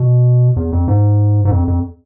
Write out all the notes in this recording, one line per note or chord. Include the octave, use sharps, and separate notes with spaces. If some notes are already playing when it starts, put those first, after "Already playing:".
Already playing: B2
E2
F2
G#2
G#2
F2
F2